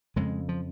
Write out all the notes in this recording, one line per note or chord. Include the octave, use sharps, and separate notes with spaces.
F2 C#3 G#3
F3